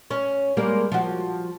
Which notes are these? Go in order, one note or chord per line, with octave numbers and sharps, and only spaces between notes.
C#4
G3 G#3 A#3
F3 F#4